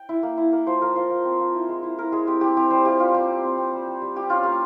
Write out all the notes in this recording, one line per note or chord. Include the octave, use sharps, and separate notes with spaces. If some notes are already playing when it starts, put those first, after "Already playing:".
Already playing: G5
E4
A#3
E4
A#3
F3 C5
F3 A#4
F4 C5
F3
C4
F3
E4
G#3
E4
E4 A#4
G#3 G#4
C4 G4
C4 G4
C4 G4
G3 C5
F4 G4
G3 F4
G3 G4
C4
C4
C4
G3
G3
G3
G3 G4
C#4 F4
A#3 G4